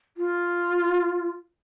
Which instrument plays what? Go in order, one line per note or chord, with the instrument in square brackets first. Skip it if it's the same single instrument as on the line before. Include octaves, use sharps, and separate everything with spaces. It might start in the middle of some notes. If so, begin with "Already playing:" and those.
[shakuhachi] F4